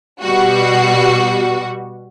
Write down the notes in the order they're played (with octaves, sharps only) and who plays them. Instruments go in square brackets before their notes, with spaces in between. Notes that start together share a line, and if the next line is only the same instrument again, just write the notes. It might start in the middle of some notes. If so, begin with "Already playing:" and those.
[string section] B2 G3 F#4